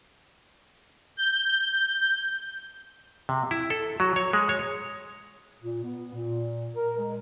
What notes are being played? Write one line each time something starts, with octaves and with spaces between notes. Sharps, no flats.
G6
C3
E4
A4
F#3
C#5
G#3
C#5
A#2
B3
A#2
A#4
G#3